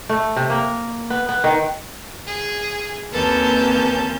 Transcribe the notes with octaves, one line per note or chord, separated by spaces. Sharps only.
A3
C3
A#3
B3
B3
D#3
G#4
D#2 A#3 C4 C#4 A4 B4 A5 G6